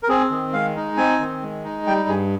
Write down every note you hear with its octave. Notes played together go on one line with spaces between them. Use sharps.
A#4
C4 G#4
D#3
G#3 F5
D#4
C4 G#5
D#3
G#3
D#4
G3 G5
G2 G#4